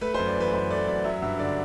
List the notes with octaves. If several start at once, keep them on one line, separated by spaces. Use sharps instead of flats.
A3 B4
C5
F#2
D5
E3 B4
F#2 C5
A3 D5
F#2 D5
F#3 E5
G2 E5
D3 D5